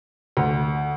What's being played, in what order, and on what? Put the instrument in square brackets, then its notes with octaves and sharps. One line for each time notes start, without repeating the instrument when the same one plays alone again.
[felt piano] D2